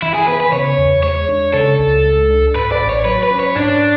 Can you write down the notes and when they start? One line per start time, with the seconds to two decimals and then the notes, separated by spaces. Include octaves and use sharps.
0.02 E3 E4
0.14 G#4
0.27 B3 B4
0.40 B4
0.52 C#3 C#5
0.78 E2
1.03 G#3 C#5
1.28 D4
1.54 C#3 A4
1.79 C#2
2.05 G#3
2.30 D4
2.55 G#2 B4
2.72 D5
2.80 A1
2.89 C#5
3.05 F#3 B4
3.23 B4
3.31 C#4
3.40 C#5
3.56 G#2 D4